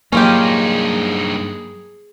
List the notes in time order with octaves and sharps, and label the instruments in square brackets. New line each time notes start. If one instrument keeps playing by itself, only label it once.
[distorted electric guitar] G2 D#4 [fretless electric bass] F#3 A#3 [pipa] C#4 F4 G4 [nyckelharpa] G#4